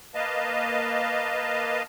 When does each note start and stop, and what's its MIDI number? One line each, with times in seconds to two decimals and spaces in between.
0.15 1.82 58
0.15 1.82 71
0.15 1.82 75
0.15 1.82 77
0.15 1.82 81